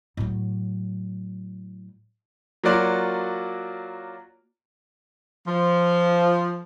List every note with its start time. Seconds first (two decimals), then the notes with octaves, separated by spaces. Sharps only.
0.17 A2 F#3
2.64 F#3 A#3 F4 F#4 D5
5.48 F3